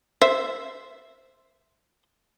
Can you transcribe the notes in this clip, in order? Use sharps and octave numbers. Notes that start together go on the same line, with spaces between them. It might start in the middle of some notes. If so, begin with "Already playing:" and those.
C5 E5